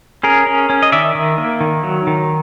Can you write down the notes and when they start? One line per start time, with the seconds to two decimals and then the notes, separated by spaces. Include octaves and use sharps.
0.23 C#4 G#4 A#4
0.47 C#4
0.70 C#4
0.82 D#5
0.92 D#3 D5 E5
1.15 D#3
1.38 A#3
1.60 D#3
1.83 F#3
2.07 D#3